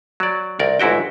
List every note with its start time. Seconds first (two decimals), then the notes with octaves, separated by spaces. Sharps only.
0.20 F#3 D5
0.59 C2 A#4 D5
0.80 G1 G#2 E4 F#4 G5